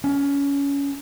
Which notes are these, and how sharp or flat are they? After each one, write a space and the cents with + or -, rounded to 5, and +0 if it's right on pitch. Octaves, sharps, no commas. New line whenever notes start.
C#4 +20